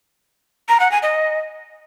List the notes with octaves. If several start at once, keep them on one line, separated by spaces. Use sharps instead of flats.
A#5
F#5
G#5
D#5